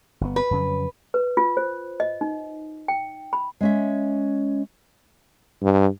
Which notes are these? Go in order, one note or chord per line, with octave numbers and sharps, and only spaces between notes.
G1 B3
B4
F2 C#3 F#3
B4
F4
C5
D#5
D#4
G5
B5
G#3 C#4 E5
G2